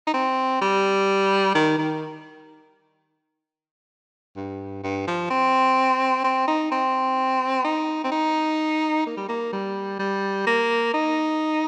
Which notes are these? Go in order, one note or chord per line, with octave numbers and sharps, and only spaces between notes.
D#4
C4
G3
D#3
D#3
G2
G2
F3
C4
C4
D#4
C4
D#4
C4
D#4
A#3
G3
A#3
G3
G3
A#3
D#4